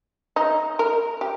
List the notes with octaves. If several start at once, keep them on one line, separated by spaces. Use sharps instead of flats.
D#4
A#4
G4